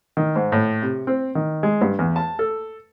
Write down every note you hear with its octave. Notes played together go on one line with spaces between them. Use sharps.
D#3
G#2
A2
C3
C4
D#3
G#3
G2
E2
A5
A4